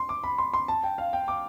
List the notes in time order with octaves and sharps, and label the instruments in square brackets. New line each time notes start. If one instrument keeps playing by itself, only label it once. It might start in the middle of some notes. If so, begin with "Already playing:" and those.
Already playing: [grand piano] C6
D6
B5
C6
C6
A5
G5
F5
G5
D6